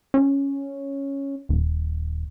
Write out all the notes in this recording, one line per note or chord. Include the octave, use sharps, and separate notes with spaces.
C#4
D#1